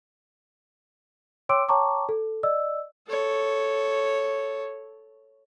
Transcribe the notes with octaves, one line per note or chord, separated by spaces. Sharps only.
C#5 G5 C6 D6 E6 D7
C#5 G5 A5 A#5 C#6 D6
A4
D5 D#5 E6
A4 C#5